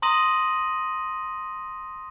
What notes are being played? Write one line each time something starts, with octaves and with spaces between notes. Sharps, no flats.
A#5 C6 D#6 A#6 D#7 F#7